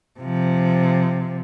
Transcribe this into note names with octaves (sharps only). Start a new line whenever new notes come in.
C3 F3